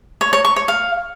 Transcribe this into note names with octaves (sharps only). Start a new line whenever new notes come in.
C#5
C#5
C#6
C#5
F5